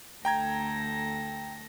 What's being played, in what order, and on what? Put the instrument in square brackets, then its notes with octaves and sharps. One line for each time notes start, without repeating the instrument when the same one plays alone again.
[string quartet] D2 A4 A#6 [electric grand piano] G5 A#5 G#6